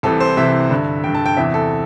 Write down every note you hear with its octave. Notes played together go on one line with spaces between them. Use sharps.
C2 C3 E3 A4
C5
C2 C3 E3 E5
G2 D3
G2 D3 G5
A5
G5
E2 C3 E3 E5
A4